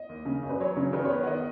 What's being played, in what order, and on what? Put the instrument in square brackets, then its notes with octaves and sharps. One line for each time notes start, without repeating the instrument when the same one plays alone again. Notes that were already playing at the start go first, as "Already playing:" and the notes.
Already playing: [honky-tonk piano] D#5
[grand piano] D#2
C#3
F#2
[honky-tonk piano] B4
[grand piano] F#3 [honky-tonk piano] C#5
[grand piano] C#3
[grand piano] D#3 [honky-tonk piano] B4
[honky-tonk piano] C#5
[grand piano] B3
[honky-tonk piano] C#5
F#5
[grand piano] D#3 [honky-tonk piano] D#5